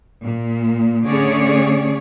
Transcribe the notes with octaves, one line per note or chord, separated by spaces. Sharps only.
A#2
D3 A3 C#4 G#4 C#5 D5